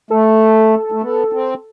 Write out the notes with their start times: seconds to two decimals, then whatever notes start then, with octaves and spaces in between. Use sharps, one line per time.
0.10 A3 A4
0.92 A3
1.02 B3
1.33 C4